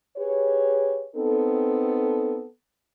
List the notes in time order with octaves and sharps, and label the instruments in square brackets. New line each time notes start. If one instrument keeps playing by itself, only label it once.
[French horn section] G4 G#4 B4 C#5
B3 C4 D#4 A4